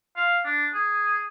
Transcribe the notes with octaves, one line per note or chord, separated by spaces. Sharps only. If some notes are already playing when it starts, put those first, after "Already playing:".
F5
D4
G#4